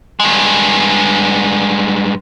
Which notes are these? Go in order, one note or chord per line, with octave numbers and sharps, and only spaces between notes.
G2 G#3